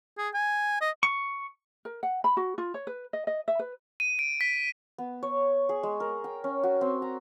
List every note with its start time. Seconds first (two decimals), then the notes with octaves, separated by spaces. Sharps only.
0.18 G#4
0.34 G#5
0.81 D#5
1.03 C#6
1.85 A#4
2.03 F#5
2.24 B5
2.37 F#4
2.58 F4
2.74 C#5
2.87 B4
3.13 D#5
3.27 D#5
3.48 E5
3.59 B4
4.00 D#7
4.19 D7
4.41 B6
4.98 B3
5.23 C#5
5.69 G#4
5.83 G#3
6.00 A#4
6.24 G5
6.44 C#4
6.63 F#4
6.81 C4
7.02 A#5